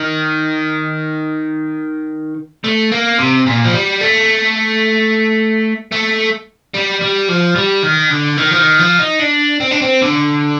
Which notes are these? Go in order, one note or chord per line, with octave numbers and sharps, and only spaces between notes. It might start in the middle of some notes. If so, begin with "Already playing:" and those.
Already playing: D#3
A3
A#3
C3
A#2
F3
G3
A3
A3
G3
G3
F3
G3
D#3
D3
D#3
F3
D#3
F3
D#4
D4
C4
D4
C4
D3